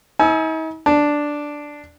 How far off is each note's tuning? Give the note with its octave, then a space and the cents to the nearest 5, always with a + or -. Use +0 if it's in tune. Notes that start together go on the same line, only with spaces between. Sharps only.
D#4 +45 G#5 +30 E6 +0
D4 +0 A5 +0